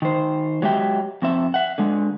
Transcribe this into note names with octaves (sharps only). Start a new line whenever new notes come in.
D#3 C5
F#3 G#3 G4 E5 G5
F2 C4 E5
E5 F#5
D3 G#3